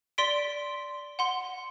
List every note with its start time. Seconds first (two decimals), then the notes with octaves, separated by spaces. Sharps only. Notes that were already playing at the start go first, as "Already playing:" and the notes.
0.18 D5 C6 B6 D7
1.19 F#5 C6